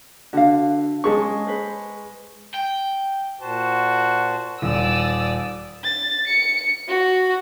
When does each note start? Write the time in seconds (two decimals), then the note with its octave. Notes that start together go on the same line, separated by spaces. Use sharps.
0.33 D3 F#4 F5
1.04 G#3 C#4 G#4 A5 C#6
1.47 B4 C5
2.54 G5
3.41 A#2 F#4 C5 A5
4.62 D#1 D5 D#6 E6
5.84 A6
6.27 C#7
6.88 F#4